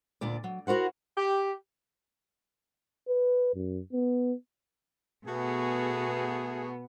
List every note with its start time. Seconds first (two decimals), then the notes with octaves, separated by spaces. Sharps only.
0.21 D2 A#2 D5
0.44 F#3
0.67 E4 F#4 A#4 C5 F#5
1.17 G4
3.08 B4
3.55 F#2
3.93 B3
5.26 B2 A3 B3 F#4 G#4